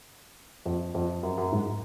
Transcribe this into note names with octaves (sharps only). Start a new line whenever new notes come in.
F2
F2
F#2
F#2
G#2